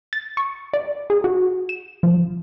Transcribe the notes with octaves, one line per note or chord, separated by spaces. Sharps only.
A6
C#6
D5
G#4
F#4
E7
F3